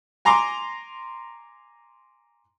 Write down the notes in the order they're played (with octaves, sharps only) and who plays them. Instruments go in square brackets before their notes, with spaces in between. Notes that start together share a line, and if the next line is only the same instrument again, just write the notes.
[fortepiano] G#5 A#5 C6 D6